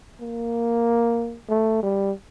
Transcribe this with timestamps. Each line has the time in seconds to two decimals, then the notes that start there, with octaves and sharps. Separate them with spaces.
0.21 A#3
1.49 A3
1.83 G3